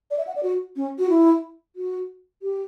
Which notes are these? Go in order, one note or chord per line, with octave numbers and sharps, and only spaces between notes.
D5
E5
F#5
D5
F#4
C#4
F#4
E4
F#4
G4